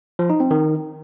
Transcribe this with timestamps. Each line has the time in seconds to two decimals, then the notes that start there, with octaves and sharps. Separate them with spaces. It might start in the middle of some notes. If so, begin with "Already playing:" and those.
0.19 F3
0.30 D#4
0.40 C4
0.51 D#3